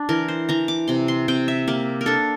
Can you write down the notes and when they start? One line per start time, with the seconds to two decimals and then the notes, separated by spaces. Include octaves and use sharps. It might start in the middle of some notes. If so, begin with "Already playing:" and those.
Already playing: D4 D5
0.09 E3 A#4
0.28 C5
0.49 E3 A#5
0.68 D6
0.88 C3 C6
1.08 C6
1.28 C3 G5
1.48 E5
1.68 A#3 G4
2.01 A#4
2.06 D4 A4